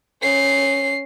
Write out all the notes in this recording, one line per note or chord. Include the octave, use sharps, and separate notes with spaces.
C#4 C7